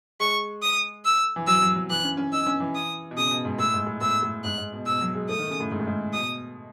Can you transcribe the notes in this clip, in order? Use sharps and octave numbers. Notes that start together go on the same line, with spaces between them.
G#3 C#6
D#6
E6
E3
F#3 E6
F#3
F#3
E3 F#6
C#4
C#4
D#4 E6
C#4
E3
D#6
B2
C#3 D#6
B2
G#2
A2 E6
G#2
A2
A2 E6
A2
G#2 F#6
G#2
B2
B2 E6
F#3
G#3
A3 D#6
D#3
C#3
A2
G#2
A2
G#2
B2 D#6